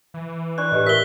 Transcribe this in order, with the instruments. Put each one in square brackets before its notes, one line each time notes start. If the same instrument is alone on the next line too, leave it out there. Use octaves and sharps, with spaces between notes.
[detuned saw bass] E3
[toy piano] D4 D5 C#6 [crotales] F#6
[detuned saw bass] A2 [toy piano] G4 B4 D#5
[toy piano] A#4 E5 [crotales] B6 G7